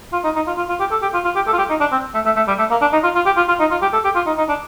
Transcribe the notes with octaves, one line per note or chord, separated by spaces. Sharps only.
F4
D#4
D#4
F4
F4
F4
G4
A4
G4
F4
F4
G4
A4
F4
G4
D#4
D4
C4
A3
A3
A3
G3
A3
A#3
D4
D#4
F4
F4
G4
F4
F4
D#4
F4
G4
A4
G4
F4
D#4
D#4
D4